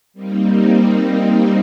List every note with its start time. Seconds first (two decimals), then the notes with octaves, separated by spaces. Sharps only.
0.13 G3 A#3 C4 D#4